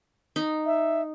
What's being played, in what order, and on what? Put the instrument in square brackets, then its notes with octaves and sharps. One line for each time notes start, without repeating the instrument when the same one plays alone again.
[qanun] D#4
[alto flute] E5